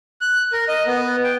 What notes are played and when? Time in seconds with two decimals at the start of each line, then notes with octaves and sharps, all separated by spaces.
0.21 F#6
0.52 A#4
0.68 D#5
0.87 B3
1.24 G5